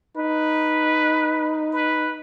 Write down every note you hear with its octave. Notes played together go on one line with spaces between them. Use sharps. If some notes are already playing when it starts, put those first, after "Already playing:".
D#4 B4
B4